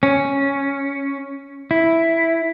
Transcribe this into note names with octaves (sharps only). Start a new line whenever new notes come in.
C#4
E4